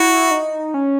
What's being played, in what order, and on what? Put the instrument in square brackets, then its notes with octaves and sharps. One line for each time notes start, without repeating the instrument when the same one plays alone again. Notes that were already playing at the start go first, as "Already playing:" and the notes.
Already playing: [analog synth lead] E4 [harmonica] F#4
[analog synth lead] D#4
C#4